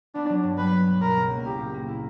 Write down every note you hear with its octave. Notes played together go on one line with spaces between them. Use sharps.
B3 D4
F#3
G2
G3 B4
B3
B1
B2 A#4
C#2
A#3
E4 G4
A#2
A#3
E4